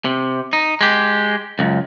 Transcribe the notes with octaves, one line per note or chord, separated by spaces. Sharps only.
C3
D#4
G#3 G4
C#2 F#2